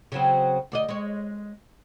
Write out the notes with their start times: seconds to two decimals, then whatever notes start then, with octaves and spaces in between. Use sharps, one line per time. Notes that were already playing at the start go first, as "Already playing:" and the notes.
0.12 C#3 F#3 C4
0.72 D2 D5 D#5
0.88 G#3 C#5